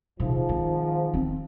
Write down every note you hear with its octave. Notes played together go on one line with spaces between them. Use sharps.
G#2 C3 D#3 F3
D#3 C4
B3 C4